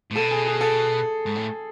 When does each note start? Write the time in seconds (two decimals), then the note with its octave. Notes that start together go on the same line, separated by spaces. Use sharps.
0.11 A2
0.16 B2 A4
0.31 G#4
0.46 G#4
0.61 A4
1.26 G#2
1.35 A2